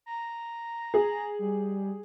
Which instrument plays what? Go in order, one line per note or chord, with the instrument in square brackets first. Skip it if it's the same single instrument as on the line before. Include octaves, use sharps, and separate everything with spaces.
[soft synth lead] A#5
[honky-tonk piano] G#4
[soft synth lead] G3